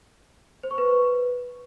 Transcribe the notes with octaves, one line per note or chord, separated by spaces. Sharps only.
C5
C#6
B4